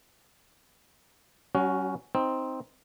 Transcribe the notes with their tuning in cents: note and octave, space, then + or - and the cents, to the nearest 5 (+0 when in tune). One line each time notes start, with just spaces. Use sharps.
F#3 +45 C#4 +10 F#4 +0
C4 +0 D#4 +15